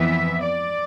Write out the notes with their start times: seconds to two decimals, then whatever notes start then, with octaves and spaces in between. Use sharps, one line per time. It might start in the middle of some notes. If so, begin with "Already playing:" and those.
Already playing: F2 E3 B3 E5
0.42 D5